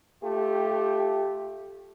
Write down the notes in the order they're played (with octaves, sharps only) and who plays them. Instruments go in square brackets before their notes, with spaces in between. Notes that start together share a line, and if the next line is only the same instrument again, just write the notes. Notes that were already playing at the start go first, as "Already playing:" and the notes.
[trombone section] A3 F4 G4